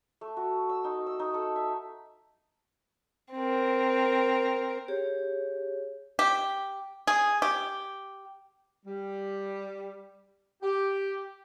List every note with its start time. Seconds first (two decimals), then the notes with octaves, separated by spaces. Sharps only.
0.21 A3
0.37 F#4
0.69 E6
0.84 D#4
1.06 E6
1.19 D#4
1.34 A4
1.56 E5
3.34 C4 A#4
4.88 G4 G#4 C#5
6.19 G4
7.07 G#4
7.42 G4
8.85 G3
10.62 G4